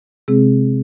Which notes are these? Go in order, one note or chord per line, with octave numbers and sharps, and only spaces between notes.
C3 G#3 C4 G#4